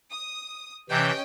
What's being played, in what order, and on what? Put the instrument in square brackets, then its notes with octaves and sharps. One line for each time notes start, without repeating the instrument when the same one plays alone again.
[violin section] D#6
[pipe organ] C3 E3 G6 [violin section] C#4 D#5 G5